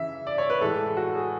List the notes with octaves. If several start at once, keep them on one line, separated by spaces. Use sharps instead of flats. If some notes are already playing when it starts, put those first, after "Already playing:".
Already playing: C#3 E3 E5
D5
C#5
B4
A2 E3 G#3 A4
F#4
G#4